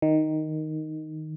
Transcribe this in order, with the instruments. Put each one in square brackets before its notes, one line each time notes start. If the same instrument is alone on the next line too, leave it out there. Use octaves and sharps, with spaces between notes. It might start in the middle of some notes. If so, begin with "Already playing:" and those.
[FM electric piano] D#3